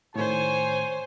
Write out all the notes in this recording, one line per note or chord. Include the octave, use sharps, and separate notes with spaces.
A2 D#3 C5 C#5 G#5